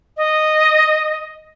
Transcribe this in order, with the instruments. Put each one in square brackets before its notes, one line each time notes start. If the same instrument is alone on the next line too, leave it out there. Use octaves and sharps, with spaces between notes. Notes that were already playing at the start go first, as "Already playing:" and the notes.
[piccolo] D#5